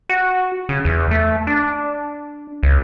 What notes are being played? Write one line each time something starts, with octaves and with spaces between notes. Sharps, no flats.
F#4
C#3
E2
A3
D4
C#2